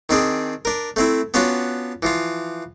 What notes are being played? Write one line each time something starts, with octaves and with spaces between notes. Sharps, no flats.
D#3 C4 D4 G#4
D4 A#4
A3 C4 E4
B3 C#4 D4 F4 F#4
E3 F3 F4